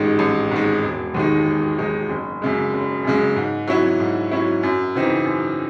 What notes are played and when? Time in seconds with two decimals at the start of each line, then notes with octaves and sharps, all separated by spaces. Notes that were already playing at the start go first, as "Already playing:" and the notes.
Already playing: A1 G#2 D#3 G#3
0.19 A1
0.51 G#2 D#3 G#3
0.83 E1
1.14 D#2 D#3 G#3 D#4
1.46 E1
1.78 D#2 D#3 G#3 D#4
2.09 F#1
2.42 F#2 C#3 G#3
2.74 F#1
3.04 F#2 C#3 G#3
3.36 G#2
3.67 F#3 C#4 E4
4.00 G#2
4.31 F#3 C#4 E4
4.63 F#2
4.95 C#3 E3 C4 D#4
5.26 F#2